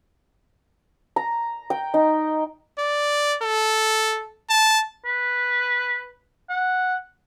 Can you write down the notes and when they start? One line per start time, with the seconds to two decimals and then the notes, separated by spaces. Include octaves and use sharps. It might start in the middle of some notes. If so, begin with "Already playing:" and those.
1.16 A#5
1.70 G5
1.94 D#4
2.78 D5
3.42 A4
4.50 A5
5.05 B4
6.49 F#5